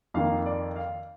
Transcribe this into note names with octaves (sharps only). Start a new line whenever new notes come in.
F2 D#3 A#3 F5
D5
F5